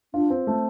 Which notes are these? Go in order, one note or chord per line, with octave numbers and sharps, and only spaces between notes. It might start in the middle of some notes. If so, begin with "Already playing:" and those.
D4 F4
C4
A3